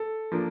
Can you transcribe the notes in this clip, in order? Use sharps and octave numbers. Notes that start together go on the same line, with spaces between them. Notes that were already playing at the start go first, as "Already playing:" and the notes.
Already playing: A4
F3 A#3 D4